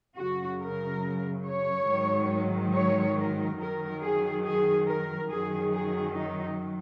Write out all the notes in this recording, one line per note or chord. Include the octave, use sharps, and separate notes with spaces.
F#2 C#3 F#3 F#4
A#4
C#5
G#2 D#3 F#3
C#5
A#4
F#2 D#3 F#3 A#4
G#4
G#4
A#4
F#2 D#3 F#3 G#4
G#4
D#4